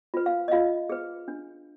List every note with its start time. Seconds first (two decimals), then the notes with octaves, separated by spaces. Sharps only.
0.14 F4 B4
0.26 F5
0.48 D#5
0.52 F4 F5
0.90 G#4 B4
1.28 D4